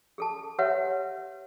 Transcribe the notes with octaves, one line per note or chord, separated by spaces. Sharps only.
G#4 A4 A5
G4 B4 C#5 E5 F#5